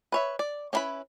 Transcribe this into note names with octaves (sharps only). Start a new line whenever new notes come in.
B4 C#5 E5
D5
C#4 D4 E4 B4 B5